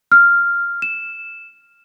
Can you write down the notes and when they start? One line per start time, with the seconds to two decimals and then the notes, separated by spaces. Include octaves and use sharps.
0.12 F6
0.82 E7